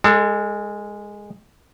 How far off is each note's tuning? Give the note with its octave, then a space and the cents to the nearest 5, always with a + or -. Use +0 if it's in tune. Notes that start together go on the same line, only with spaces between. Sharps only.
G#3 -10 A4 +30